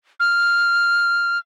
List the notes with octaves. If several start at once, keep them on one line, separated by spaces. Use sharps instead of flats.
F6